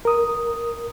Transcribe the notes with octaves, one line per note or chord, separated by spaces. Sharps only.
A#4 D#6